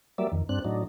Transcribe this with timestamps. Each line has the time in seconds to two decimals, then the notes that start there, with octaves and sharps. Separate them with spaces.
0.18 F#3 G3 A#3 D5 E5
0.32 F2 D#3
0.49 G2 C4 D4 F#6
0.65 A2 F#3 D4 D#4